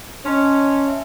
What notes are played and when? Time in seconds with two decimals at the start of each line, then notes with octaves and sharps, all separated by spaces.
0.26 C#4 D#5 A5 C6
0.88 E5